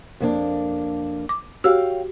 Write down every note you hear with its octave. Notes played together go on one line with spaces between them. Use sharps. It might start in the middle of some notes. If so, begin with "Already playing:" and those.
F2 A#3 D4
D6
F#4 G4 C#5 F5 G5 E6